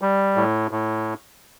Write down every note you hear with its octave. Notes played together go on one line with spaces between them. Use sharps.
G3
A2
A2